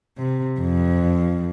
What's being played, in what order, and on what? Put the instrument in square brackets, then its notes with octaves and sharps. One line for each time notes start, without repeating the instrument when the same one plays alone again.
[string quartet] C3
F2